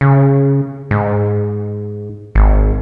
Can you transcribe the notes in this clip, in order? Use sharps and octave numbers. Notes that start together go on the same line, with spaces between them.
C#3
G#2
G#1